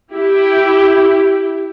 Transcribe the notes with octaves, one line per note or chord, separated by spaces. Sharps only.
E4 G4